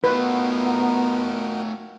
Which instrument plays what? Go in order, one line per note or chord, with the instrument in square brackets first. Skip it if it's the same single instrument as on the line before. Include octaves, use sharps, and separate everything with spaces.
[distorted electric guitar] A3 F4 [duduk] B3 [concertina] D#4 F#4 A#4 [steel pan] B4